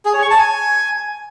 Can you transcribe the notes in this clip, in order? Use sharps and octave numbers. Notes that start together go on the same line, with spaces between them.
G#4
C#5
C#6
A5
G#5